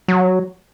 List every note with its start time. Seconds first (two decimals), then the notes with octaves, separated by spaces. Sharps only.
0.08 F#3